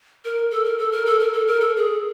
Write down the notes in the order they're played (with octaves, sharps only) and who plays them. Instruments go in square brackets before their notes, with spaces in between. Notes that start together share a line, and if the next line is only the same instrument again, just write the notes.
[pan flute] A#4
A4
A#4
A4
A#4
A4
A#4
A4
A#4
A4
G#4